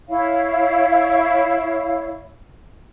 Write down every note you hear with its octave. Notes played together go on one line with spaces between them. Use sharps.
E4 C#5 F5